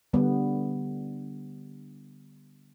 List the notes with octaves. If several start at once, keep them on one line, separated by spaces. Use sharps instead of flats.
D3 G3 B3